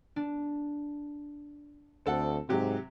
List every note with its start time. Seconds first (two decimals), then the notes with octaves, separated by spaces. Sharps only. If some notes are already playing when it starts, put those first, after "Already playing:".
0.16 D4
2.06 D2 C4 A4 F#5
2.49 G#2 C3 F#3 G4